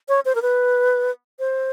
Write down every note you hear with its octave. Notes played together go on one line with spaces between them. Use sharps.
C#5
C5
A#4
B4
C5